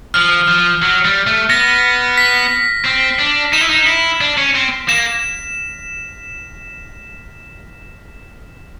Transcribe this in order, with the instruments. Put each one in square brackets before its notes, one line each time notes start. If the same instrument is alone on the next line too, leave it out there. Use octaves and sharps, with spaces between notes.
[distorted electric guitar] F3 [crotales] F6
[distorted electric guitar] F3
F#3
G3
A3
[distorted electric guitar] B3 [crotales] A#6
[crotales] B6
[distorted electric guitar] C4
D4
[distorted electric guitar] D#4 [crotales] E7
[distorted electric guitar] E4
D#4
E4
D4
C#4
C4
[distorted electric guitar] A#3 [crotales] E7